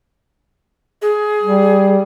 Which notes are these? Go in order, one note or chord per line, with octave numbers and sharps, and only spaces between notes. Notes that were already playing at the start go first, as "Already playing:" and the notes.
G#4
G3